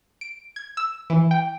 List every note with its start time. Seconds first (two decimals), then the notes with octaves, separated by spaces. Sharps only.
0.21 D7
0.56 G#6
0.77 E6
1.10 E3
1.31 G5